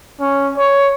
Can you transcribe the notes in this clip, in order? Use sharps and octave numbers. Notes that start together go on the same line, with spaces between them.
C#4
C#5